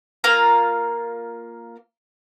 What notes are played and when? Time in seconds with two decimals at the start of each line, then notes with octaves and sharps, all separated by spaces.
0.24 A#3 F4 F5 A#5